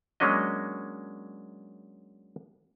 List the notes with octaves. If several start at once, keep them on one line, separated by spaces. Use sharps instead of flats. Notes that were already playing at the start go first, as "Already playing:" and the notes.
F#3 G#3 A#3 C#4 D4 D#5